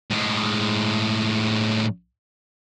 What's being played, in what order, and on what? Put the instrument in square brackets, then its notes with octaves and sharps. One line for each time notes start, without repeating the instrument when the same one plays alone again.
[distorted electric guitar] A2 G#3